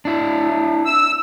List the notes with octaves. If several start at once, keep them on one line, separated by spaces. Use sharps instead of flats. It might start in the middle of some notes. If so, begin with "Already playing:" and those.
D4 E4
E6